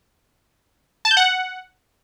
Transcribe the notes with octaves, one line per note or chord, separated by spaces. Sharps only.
A5
G6
F#5